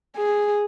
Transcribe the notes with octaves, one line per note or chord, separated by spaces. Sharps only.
G#4